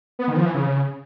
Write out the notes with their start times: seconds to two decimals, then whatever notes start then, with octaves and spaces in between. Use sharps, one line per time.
0.19 B3
0.28 D#3
0.37 F3
0.46 E3
0.54 C#3